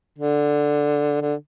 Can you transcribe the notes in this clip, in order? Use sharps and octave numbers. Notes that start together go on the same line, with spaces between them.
D3
D3